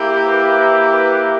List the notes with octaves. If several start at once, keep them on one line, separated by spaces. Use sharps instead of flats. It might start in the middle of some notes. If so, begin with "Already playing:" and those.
Already playing: A#3 E4 G4
B4
B4